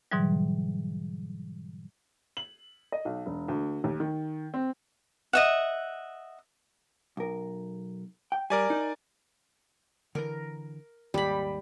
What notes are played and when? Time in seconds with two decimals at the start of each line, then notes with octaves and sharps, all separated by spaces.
0.12 G#2 B2 D3 E3 F#3 G3
2.37 F#7
2.92 D#5
3.05 B1
3.26 E1
3.48 D2
3.84 D#2
4.00 D#3
4.54 C4
5.33 D#5 E5 F#5
7.17 B1 A#4
8.32 G5
8.50 G3 A#4 D5 G#5
8.70 D#4
10.15 D3 E3 A#4
11.14 D#2 G#2 G3 B5